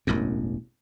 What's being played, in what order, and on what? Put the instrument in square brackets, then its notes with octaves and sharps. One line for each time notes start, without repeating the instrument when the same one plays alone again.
[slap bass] E1 A1 F#2